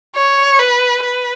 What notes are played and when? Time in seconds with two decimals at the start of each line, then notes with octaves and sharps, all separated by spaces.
0.16 C#5
0.59 B4
1.02 B4